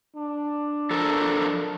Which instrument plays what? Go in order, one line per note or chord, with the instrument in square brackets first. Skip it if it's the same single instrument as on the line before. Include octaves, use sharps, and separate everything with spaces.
[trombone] D4
[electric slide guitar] F3 A4 A#4